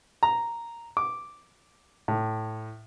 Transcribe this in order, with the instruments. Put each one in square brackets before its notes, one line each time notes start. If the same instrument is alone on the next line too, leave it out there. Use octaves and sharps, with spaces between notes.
[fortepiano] A#5
D6
A2